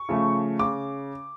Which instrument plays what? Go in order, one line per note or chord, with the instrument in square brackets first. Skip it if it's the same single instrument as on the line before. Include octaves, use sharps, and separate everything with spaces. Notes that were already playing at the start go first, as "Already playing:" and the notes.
Already playing: [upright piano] C#6
C#3 F3 A3
C#3 D6